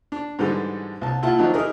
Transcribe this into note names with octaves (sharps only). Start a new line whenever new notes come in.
D4
G#2 D3 E3 G3 G#3
C2 A5
A#2 E4 F4 F#5 A5
D#3 F3 F#3 D4 D#4
D#4 E4 G4 G#4 A#4